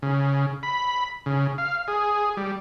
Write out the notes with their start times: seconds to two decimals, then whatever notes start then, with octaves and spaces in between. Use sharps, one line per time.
0.02 C#3
0.63 B5
1.26 C#3
1.58 F5
1.88 G#4
2.37 G3